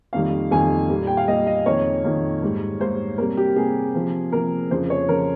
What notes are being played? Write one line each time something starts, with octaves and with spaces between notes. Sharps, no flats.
F2 D#3 G3 A#3 F5
F2 D#3 G3 A#3 G#5
A#2 G3 A#3
G5
F5
A#2 G3 A#3 D#5
D#5
F2 D#3 A#3 C#5
F2 D#3 A#3
G#2 G3 A#3
G#2 G3 A#3 C5
C3 G3 A#3 A#4
G4
C3 G3 A#3 G#4
C3 F3 A#3
C3 F3 A#3 A#4
F2 C#3 F3 C5
C#5
C#3 F3 A#4